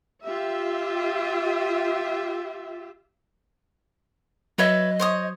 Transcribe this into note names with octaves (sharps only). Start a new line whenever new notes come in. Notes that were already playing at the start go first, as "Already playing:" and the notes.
F4 G4 E5
F#3 B4 C#5 D#5 E5
C5 C#5 D#6